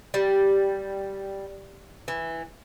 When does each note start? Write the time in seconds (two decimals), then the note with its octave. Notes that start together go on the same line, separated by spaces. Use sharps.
0.14 G3
2.08 E3